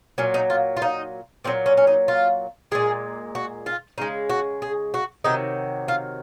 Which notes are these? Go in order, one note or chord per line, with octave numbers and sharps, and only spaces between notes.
A#2 F#3 C#4
D#4
F4
F4
D#4
A#2 F#3 C4
C#4
C#4
D#4
F4
A#2 G#3 G#4
F#4
F4
C#3 G#3 D#4
F#4
G#4
F#4
C3 D#3 F#3 D#4
F4